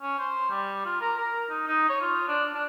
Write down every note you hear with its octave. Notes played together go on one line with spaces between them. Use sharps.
C#4
C5
G3
F4
A#4
A#4
D#4
D#4
C#5
F4
D4
D4